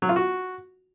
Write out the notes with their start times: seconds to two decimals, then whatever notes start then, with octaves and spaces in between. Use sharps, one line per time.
0.02 F#3
0.09 F4
0.16 F#4